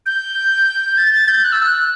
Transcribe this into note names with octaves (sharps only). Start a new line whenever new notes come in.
G6
A6
A6
G6
F#6
E6
F#6